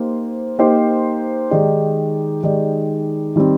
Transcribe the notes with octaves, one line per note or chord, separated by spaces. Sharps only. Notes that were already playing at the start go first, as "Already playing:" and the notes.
Already playing: A#3 D#4 G4 C5
A#3 D#4 G4 C5
D#3 G#3 D#4 G4 D5
D#3 G#3 D#4 G4 D5
D#3 G3 C4